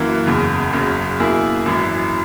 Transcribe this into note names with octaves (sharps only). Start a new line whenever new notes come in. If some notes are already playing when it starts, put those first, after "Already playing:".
Already playing: F#2 E3 A#3
F#1 E2 C#3
F#1 F#2 C#3 F#3
B2 A#3 E4 G#4
G#1 F#2 E3